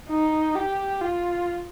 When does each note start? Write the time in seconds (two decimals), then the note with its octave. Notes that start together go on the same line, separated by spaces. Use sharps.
0.09 D#4
0.55 G4
1.01 F4